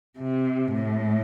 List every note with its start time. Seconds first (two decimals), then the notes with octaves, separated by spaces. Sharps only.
0.19 C3
0.74 A2